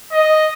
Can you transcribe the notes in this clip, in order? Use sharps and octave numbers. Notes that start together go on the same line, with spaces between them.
D#5